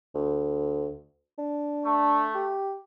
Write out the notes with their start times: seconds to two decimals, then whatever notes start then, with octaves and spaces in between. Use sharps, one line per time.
0.15 D2
1.38 D4
1.85 A3
2.35 G4